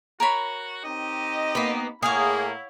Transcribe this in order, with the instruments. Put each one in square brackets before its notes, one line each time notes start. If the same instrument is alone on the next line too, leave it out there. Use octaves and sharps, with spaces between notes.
[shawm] F#4 [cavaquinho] A#4 C#5 B5
[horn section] C4 D#4 G4 [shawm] D#5
[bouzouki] A#3 B3 [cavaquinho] B5
[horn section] A2 A#3 [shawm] E4 [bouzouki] G#4 [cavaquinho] C#5 F5 F#5